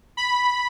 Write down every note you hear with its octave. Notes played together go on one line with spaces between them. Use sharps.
B5